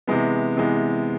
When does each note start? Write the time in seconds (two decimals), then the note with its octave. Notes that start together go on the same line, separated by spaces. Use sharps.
0.07 C3 E3 G#3 B3
0.57 C3 E3 G#3 B3